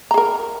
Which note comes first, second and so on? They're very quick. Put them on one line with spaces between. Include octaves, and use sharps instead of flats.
A#5 G#4 A#4